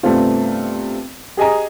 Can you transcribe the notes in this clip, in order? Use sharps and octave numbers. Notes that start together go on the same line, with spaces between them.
G2 C3 A3 B3 C4 F4
G4 G#4 D#5 G#5 A#5